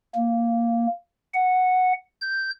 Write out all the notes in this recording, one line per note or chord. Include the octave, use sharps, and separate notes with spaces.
A#3
F#5
G6